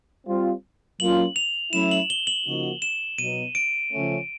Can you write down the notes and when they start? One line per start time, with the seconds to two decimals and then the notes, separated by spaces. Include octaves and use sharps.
0.27 G3 C4 F4
1.00 F#3 A#3 C#4 F4 F#7
1.36 F7
1.73 F#3 A3 C#4 E4 E7
1.91 F#7
2.10 G7
2.27 F#7
2.46 C#3 F3 A#3 D#4 F#4
2.82 E7
3.18 B2 F#3 B3 D#4 D#7
3.55 D7
3.92 C#3 F3 A3 C#4